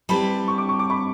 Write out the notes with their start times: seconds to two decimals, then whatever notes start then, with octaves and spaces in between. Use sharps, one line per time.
0.09 G3 C4 E4 G4 B4 A5 B5
0.48 C#6
0.58 D6
0.69 C#6
0.79 D6
0.90 B5 C#6